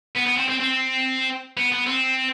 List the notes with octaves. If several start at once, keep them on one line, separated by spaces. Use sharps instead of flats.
B3
B3
C4
C4
C4
B3
B3
C4